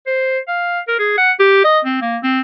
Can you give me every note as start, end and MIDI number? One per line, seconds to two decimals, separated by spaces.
0.07 0.39 72
0.48 0.80 77
0.88 0.96 70
0.99 1.17 68
1.18 1.32 78
1.40 1.64 67
1.64 1.79 75
1.85 1.98 60
2.02 2.18 58
2.23 2.41 60